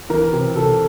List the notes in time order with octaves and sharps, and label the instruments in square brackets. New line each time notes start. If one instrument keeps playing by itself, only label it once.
[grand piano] E3 A#4
C3
C3 A4